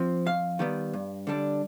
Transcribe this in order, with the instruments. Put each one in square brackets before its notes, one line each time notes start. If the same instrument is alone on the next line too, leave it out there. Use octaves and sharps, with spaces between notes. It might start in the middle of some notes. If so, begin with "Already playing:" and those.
Already playing: [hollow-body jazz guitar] F3 C4
F2 F5
D#3 G3 B3
G2
D3 G3 D4